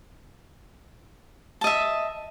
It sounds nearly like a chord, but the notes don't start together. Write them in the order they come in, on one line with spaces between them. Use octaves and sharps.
A5 D#5 E5